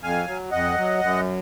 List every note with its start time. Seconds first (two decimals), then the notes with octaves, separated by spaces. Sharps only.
0.03 F2 F5 G#5
0.27 F#3
0.52 F2 D#5 F#5
0.78 F#3
1.02 F#2